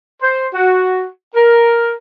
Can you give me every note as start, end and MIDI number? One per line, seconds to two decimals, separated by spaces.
0.22 0.46 72
0.53 1.06 66
1.35 1.92 70